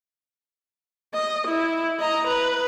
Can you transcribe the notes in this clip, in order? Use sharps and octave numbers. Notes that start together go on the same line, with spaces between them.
D#5
E4
D#5 A#5
B4